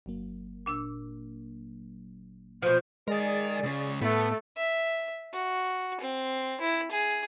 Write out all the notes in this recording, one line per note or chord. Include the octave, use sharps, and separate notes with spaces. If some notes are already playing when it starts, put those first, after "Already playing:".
G1 F#3 A#3
A#2 D4 E6
B2 F3 C5
G#3 G#4 A#4 D5 D#5
C#2 C#3
A2 A3 B3 A4
E5
F#4
C4
E4
G#4